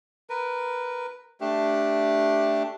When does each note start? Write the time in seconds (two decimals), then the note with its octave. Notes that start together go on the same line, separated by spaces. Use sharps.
0.30 A#4 B4
1.41 A3 D4 G4